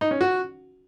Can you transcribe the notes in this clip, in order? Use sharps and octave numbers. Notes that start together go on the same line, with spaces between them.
D#4
C#4
F#4